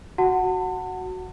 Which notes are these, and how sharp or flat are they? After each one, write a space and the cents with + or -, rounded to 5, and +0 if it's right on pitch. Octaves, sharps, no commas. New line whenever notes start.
F#4 +0 F#5 +0 A5 +35